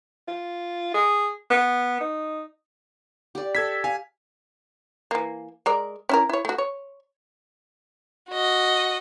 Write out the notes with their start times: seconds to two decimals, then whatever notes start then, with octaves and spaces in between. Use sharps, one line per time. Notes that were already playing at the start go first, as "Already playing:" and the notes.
0.28 F4
0.94 G#4
1.51 B3
2.01 D#4
3.35 G4 D5
3.55 A4 E5 G#6 B6
3.84 F5 G#5
5.11 E3 A#3
5.66 G#3 A#4 D5
6.09 C#4 E4 A#4
6.29 E4 C#5
6.45 A3 F#4
6.58 C#5
8.30 F#4 D#5